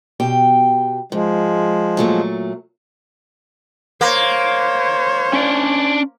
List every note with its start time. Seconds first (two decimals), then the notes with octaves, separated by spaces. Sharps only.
0.20 B2 G4 G5
1.12 G#2 F3 G#3
1.97 A#2 F#3 A3
4.01 A#3 C5 C#5
5.33 C#4 D4 D5